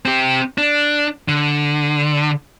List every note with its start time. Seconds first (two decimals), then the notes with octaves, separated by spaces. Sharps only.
0.05 C4 G4
0.58 D4
1.28 D3